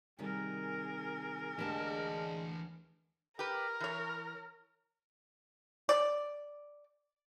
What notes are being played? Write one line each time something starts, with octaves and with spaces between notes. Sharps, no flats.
C3 D#3 G3 G#4 A#4
D2 E3 G#3 B3 D4 G4 A5
G4 A#4 B4
E3 C#5
D5